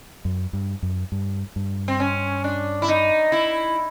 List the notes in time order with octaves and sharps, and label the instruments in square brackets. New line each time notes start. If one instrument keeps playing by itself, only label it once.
[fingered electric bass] F#2
G2
F#2
G2
G2
[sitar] C4
C#4
D4
E4
D#4
E4